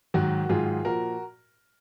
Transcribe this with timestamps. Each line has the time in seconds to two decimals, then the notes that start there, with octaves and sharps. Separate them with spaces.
0.14 G#2 D#3 F#3 F#4
0.49 G#2 D#3 F#3 F4 G#4
0.85 A#2 F3 F#4 A#4